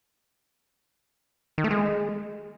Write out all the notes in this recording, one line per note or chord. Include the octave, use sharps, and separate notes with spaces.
D#3
A3
G#3